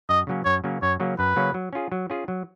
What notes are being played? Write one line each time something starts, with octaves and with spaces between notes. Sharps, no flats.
F#2 D#5
C#3 F#3 A#3 C#4
F#2 C#5
C#3 F#3 A#3 C#4
F#2 C#5
C#3 F#3 A#3 C#4
F#2 B4
C#3 F#3 A#3 C#4
F#3
C#4 F4 G#4
F#3
C#4 F4 G#4
F#3